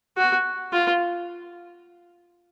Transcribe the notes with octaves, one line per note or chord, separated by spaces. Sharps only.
F#4
F4